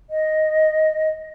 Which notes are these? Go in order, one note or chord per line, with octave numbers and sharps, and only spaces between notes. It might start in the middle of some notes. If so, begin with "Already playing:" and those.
D#5